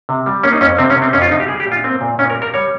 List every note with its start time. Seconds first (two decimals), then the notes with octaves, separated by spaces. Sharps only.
0.09 C3
0.26 G3
0.43 A#3 C#4
0.53 D#4
0.61 F2 C#4
0.78 C3 C4
0.90 C#4
0.96 C3
1.02 C4
1.13 F2 C#4
1.22 F4
1.31 C3 D#4
1.40 G4
1.48 G3 G#4
1.60 G4
1.66 A#2
1.72 F4
1.84 A#3 C4
2.01 A#2
2.18 A#2 C#4
2.30 A#4
2.36 G3
2.42 A#4
2.54 G3 C#5